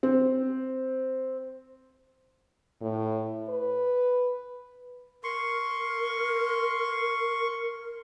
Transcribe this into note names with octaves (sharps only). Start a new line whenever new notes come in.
C4
A2
B4
A#4 C6 C#6